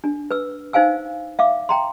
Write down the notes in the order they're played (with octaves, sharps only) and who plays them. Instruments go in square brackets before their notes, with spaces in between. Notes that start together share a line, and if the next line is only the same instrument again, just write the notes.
[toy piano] D4
B4 E6
D#4 C5 F5 G#5 E6
E5 F5 D6
G5 A#5 C6